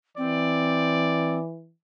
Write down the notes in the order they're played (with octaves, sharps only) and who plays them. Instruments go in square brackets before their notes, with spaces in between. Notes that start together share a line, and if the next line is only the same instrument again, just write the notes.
[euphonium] E3 [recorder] C4 [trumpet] D5